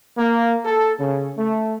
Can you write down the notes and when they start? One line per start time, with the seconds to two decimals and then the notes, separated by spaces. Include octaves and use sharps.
0.18 A#3
0.65 A4
1.00 C#3
1.38 A3